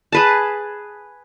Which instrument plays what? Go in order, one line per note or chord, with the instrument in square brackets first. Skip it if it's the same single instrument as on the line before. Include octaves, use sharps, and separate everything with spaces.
[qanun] G#4 B4 A5